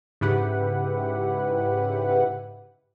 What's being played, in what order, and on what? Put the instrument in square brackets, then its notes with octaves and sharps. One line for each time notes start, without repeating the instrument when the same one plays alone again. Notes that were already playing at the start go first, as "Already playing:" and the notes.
[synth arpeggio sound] G#2 C#3 E4 G4 B4 F#5